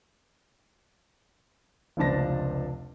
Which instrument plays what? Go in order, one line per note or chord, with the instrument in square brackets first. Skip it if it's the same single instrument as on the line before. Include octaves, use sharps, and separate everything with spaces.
[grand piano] F1 C#2 F3 D4 A5 A#6